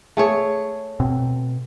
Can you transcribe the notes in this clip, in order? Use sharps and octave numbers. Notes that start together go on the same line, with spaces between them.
A3 G#4 C#5
B2 C4